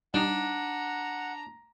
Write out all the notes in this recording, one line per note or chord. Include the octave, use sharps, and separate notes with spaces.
G3 D4 D#4 F#5 A#5